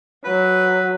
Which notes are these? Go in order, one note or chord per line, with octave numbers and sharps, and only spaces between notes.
F#3 B4